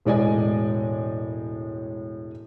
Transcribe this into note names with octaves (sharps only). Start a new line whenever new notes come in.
E1 A2 G#3 D5 D#5 G#5